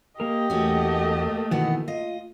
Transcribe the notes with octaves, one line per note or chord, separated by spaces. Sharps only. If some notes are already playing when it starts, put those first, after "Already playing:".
A#3 G4 A#4 D#5
E2 A3 A#3 C#4 F#4
B2 D#3 E3 B3 F#5
F4 D#5